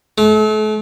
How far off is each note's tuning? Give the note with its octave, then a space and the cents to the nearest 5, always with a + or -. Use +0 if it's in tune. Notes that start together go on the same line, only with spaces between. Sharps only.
A3 -40